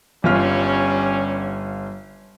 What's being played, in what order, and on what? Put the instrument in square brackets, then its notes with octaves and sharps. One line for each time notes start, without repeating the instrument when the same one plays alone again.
[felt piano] G1 F4 F6 [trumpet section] G3 C#4